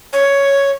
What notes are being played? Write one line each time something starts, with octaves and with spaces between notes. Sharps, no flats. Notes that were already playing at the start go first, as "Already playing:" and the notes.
C#5